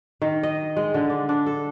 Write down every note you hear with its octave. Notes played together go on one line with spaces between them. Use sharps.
D#3
D#5
G#3
D3
D4
D4
A4